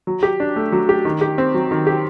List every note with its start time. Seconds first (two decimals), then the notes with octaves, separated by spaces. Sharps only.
0.07 F#3
0.23 G4
0.40 D4
0.56 A3
0.72 F#3
0.89 G4
1.05 D#3
1.21 G4
1.38 C4
1.54 F#3
1.71 D#3
1.87 G4